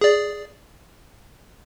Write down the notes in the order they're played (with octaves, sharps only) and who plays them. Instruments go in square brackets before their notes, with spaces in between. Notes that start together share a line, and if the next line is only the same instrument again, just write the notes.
[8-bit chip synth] G#4 D5